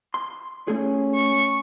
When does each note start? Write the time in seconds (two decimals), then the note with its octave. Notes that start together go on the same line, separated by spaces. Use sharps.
0.14 C6
0.68 A3 C#4 G#4
1.14 C#6